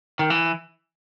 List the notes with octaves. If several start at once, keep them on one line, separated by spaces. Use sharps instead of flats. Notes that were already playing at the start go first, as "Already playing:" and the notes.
D#3
E3